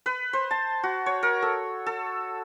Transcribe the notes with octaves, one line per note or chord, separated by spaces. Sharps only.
B4
C5
A5
F#4
C#5
A#4
A4
A4